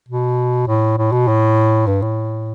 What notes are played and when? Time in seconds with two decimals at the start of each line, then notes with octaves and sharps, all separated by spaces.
0.09 B2
0.67 A2
0.98 A2
1.12 B2
1.28 A2
1.87 G2
2.02 A2